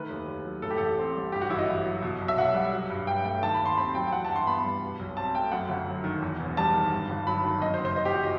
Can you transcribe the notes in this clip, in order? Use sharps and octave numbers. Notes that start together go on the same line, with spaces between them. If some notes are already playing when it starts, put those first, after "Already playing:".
Already playing: D#3 A3 B4
D#2
D#2
F#3
A2 A4
G4
A1 A4
C4
G3
G2 G4
F#4
A1 E4
D#5
A1
F#3
B2
B1
E5
B1 F#5
G3
F#3
G2
G2 G5
A3 G5
D#3 A5
B5
D#2
C6
C4 B5
F#3 G5
G5
E3 F#5
G2 A5
C6
B3 B5
G3
B2
B1
C4 A5
A3 G5
F#2 F#5
G1
F#3
D#3
E2
E1
G3 A5
D#3
G2
G1
F#3 B5
D#3
F#2 D#5
C5
F#1
C5
F#1 D#5
G4
E3 F#4
D#5